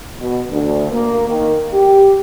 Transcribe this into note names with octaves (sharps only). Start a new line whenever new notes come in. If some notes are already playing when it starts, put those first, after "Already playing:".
B2
D2
A#3
D#3
G4